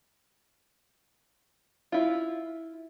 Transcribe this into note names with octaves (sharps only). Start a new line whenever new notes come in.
E4 F4